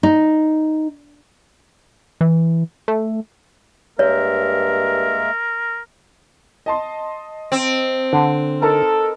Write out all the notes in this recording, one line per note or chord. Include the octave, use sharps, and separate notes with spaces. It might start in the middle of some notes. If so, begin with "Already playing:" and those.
D#4
E3
A3
G2 G#3 A#3 A#4 C#5 E5
D#5 A5 C6
C4
D3
D#4 A4 A#4 A5